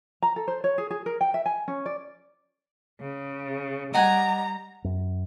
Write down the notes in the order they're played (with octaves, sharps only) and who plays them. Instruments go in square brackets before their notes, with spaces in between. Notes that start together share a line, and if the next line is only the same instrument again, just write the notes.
[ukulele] A#5
A4
C5
C#5
G#4
G#4
A#4
G5
E5
G#5
C#4
D5
[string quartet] C#3
[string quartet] G3 A#5 [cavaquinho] D#5 F#5 G#5
[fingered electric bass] F#2